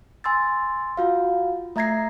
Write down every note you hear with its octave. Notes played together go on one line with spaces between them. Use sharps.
G#5 C6 E6 A6
F4 F#4 F5
A3 E5 A#5 G#6 A#6 C7